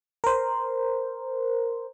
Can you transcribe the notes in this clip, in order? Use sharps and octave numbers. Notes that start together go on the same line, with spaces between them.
A#4 C5